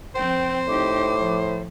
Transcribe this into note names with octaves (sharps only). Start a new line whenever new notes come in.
F3 C4 C5 G5
A2 D#4 G4 D6
F3